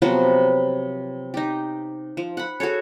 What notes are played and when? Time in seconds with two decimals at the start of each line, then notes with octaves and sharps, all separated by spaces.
0.02 C3 F3 F#3 B3
1.34 D#4 G4
2.17 F3
2.37 F#5 B5
2.60 F#4 G#4 A4 C#5